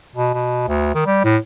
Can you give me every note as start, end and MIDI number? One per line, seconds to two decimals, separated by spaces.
0.16 0.34 47
0.34 0.65 47
0.68 0.91 38
0.95 1.03 51
1.06 1.20 55
1.24 1.37 45